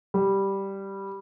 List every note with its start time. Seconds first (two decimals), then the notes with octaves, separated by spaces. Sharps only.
0.14 G3